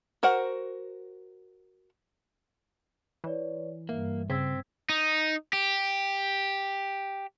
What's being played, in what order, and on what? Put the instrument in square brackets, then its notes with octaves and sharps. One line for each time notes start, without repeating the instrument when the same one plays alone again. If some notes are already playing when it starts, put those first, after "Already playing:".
[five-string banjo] F#4 A#4 C5 F#5
[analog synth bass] E3 [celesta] B4 C#5 D5
[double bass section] G2 [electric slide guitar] A#3 [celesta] E5
[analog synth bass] C#3 [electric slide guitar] C4 [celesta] E6 G#6 B6
[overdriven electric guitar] D#4
G4